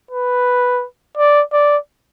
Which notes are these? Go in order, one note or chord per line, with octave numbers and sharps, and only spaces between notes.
B4
D5
D5